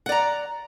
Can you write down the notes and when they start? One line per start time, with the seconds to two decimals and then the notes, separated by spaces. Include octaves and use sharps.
0.06 F#5
0.09 D5
0.12 A#5